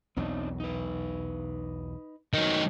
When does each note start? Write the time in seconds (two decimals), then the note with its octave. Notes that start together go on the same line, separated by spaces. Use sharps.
0.17 B1 E2 F#3 C4 D4 D#4
0.60 D#4 B4
2.34 D#3 F#3 D#5